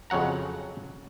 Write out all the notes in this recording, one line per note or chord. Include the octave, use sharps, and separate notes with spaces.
F2 C#3 F#3 F#5 A#5